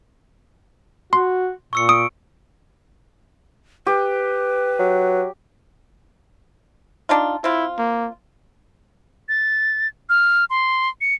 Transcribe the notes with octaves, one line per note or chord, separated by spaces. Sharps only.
F#4 C6
A#2 C#6 E6 C#7
D#6 D7
G4 B4
F#3
D4 D#4 F4
C4 E4 F4
A#3
A6
F6
C6
C#7